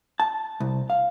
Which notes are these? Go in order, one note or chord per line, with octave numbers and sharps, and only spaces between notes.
A5
C2
F5